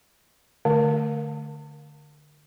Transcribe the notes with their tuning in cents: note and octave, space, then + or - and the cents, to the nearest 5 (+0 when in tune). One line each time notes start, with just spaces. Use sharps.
D3 +10 A3 +0